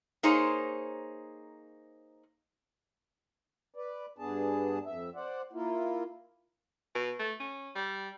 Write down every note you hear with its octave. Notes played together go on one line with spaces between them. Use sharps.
A#3 D#4 G#4 C5 C#5
B4 D5
G2 B3 D4 G#4 A5
F2 E5
C5 D5 F#5
A#3 E4 F4
B2
A3
C#4
G3